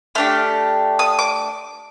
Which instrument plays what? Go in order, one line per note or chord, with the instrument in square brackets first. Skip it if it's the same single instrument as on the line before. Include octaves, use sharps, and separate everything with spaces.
[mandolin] A3 D4 G4 F6
D#6
D6